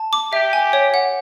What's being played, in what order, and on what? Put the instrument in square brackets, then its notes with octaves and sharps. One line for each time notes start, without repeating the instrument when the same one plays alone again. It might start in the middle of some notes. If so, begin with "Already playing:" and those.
Already playing: [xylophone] A5
D6
[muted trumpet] G4 [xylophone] E5
[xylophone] G#5
C#5
F#5